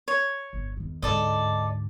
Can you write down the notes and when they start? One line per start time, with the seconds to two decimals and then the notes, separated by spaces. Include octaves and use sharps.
0.08 C#5
0.53 G1
0.77 E2 D#3
1.02 D2 G#2 A4 D5 D#5